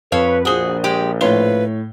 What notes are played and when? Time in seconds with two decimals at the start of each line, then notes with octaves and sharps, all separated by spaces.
0.12 F2 A4 B4 C#5 F5
0.45 A#1 F#4 G#4 C5 D#6 G7
0.84 G#3 G4
1.21 A2 F4 B4 C#5 G7